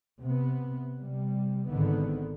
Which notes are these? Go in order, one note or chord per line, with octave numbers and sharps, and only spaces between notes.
C3 B3
C3 G3
G#1 D3 D#3 B3